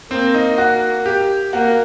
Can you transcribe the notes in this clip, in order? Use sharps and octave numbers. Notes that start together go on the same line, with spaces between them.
A#3 C4
D#4
F#4
G4
A#3 F#4